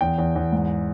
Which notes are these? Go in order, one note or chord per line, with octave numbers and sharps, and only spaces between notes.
E2 G5
E2
E2
G#2